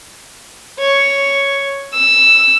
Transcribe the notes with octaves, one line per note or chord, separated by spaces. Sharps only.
C#5
E6